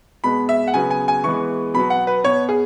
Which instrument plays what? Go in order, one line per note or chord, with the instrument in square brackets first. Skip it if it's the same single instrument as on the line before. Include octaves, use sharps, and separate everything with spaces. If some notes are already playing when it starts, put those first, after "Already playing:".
[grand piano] B2 G#3 B3 B5
E5
F#5
C#3 F#3 B3 G#5
G#5
G#5
E3 G#3 B3 C#6
B2 F#3 B3 B5
F#5
B4
B2 B3 C#5
G#4